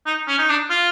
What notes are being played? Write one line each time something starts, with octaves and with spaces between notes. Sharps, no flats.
D#4
C#4
D#4
D4
F4